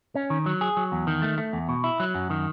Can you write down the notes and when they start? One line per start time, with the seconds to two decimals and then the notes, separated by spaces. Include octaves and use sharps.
0.15 C#4
0.30 D#3
0.46 F#3
0.61 G#4
0.77 F#3
0.92 E2
1.07 D#3
1.22 A3
1.38 A3
1.53 E2
1.69 B2
1.84 E4
2.00 F#3
2.15 F#2
2.30 D#3